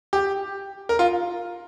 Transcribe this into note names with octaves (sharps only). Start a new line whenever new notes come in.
G4
A#4
F4